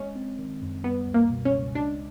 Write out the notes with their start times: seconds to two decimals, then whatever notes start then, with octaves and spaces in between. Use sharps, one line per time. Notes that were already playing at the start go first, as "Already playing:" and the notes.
Already playing: G#3 C#4
0.16 C4
0.38 D#3
0.61 F#2
0.84 G3 B3
1.07 C#2
1.14 A#3
1.30 B2
1.45 C#4
1.53 C#2
1.75 G#3 D4